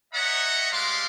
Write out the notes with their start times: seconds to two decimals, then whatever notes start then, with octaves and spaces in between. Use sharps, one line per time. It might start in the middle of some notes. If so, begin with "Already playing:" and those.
0.13 C#5 D#5 E5 F#5 A#5
0.71 G3 G#3 F5 C6 D6